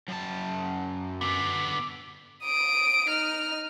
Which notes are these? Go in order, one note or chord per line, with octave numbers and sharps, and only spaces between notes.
F#2 A5
D3 B3 D6
D#6 D7
D#4 F6